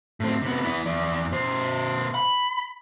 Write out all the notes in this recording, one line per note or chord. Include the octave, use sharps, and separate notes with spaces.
A2 C4
C3 B3
B3 E4
E2 D5
B2 C5
B5